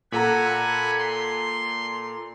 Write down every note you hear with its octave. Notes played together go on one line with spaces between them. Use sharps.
A#2 A4 F#5 G#5 A#5 B5
C6